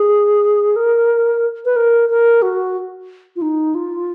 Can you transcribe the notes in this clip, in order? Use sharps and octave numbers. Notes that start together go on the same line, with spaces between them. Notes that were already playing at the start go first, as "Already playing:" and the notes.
Already playing: G#4
A#4
B4
A#4
A#4
F#4
F4
D#4
F4